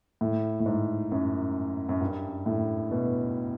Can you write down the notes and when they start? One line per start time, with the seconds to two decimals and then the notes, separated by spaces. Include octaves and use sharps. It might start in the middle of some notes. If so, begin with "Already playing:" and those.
0.21 A2
0.60 A2
0.66 G#2
1.12 F#2
1.89 F#2
2.01 G2
2.46 A2
2.91 B2